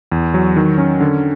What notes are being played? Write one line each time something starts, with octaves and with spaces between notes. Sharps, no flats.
E2
F#3
D#3
C#4
D3